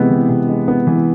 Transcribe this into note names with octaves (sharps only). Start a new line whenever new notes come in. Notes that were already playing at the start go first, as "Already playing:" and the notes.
Already playing: C3 E3 G#3 B3
E3
C3
G#3
B3
E3